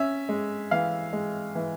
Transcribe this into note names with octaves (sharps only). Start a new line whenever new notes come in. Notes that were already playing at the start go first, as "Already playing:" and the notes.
Already playing: C#4 E5
G#3
E3 F5
G#3
E3